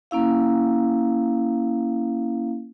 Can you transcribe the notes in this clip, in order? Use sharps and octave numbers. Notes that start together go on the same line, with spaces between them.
A#3 C#4 E4 F5